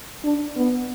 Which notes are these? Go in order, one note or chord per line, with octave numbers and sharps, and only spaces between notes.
D4
B3